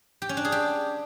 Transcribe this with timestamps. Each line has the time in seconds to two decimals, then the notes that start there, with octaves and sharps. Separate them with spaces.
0.22 G4
0.29 C#4
0.37 D4
0.45 G#4
0.52 G4